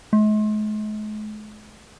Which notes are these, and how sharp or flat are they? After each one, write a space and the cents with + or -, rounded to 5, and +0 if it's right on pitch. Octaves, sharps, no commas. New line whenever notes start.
G#3 +45